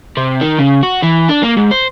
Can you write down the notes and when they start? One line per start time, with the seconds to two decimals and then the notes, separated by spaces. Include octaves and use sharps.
0.17 C3
0.41 D#3
0.59 C#3
0.83 F#4
1.03 E3
1.29 D4
1.43 A#3
1.57 G#2
1.72 C5